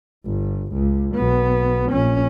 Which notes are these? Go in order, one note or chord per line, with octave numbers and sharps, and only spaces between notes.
G1
C#2
B1 B3
A#1 C#4